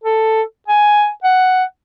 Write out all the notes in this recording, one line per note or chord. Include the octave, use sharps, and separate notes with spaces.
A4
G#5
F#5